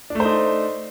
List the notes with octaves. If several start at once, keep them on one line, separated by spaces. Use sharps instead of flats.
A3 D4 D#4 C5